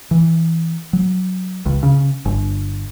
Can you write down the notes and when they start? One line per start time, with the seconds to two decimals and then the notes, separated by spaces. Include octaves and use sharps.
0.11 E3
0.93 F#3
1.66 C#2
1.83 C#3
2.25 G1